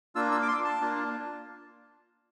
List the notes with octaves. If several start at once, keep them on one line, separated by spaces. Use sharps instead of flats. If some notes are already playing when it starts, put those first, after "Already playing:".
A#3 D4 F4 E6
E6
D6
C6
A5
A#3 D4 F4